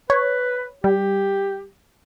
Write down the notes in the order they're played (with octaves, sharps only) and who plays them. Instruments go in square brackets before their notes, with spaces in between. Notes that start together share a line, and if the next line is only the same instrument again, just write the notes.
[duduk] B4 [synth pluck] C#5
[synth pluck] G3 [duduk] G4